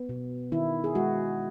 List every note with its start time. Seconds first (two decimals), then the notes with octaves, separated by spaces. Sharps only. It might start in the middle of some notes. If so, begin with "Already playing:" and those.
Already playing: B3
0.09 B2
0.52 D#3 E4
0.84 G#4
0.95 G#3 F#4